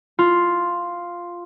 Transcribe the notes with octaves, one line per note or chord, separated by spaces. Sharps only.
F4